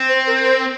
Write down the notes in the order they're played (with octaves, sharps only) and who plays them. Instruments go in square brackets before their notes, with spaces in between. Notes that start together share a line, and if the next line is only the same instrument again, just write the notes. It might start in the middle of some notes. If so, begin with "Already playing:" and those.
Already playing: [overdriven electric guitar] C4
[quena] C5
A#4
C5